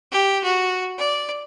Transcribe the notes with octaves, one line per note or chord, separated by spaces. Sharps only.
G4
F#4
D5